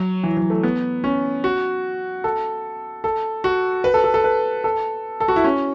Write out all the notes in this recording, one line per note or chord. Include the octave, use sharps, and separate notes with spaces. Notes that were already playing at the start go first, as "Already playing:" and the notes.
Already playing: F#3
E3
F#3
A3
B3
C#4
F#4
A4
A4
F#4
B4
A4
A4
A4
B4
A4
A4
F#4
E4
C#4